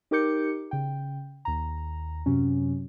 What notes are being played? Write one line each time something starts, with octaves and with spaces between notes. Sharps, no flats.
D#4 G4 A#4 D6 G6 C#7
C#3 G5
D#2 A#5
F#2 C3 F#3 C#4